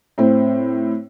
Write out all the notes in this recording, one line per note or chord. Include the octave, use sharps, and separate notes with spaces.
A2 C4